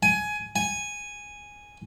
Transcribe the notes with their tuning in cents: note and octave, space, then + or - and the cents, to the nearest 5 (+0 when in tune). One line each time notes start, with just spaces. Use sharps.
G#5 +15
G#5 -5